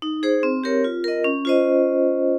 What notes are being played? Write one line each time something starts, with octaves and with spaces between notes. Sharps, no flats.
D#4
G#4 C5
C4
G4 A#4 C#5
F4
A#4 D#5
C#4
F4 C5 D#5